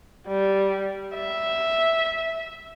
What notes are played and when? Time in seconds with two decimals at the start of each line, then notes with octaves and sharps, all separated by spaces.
0.28 G3
1.14 E5